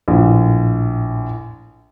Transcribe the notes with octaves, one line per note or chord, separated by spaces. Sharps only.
A#1 A2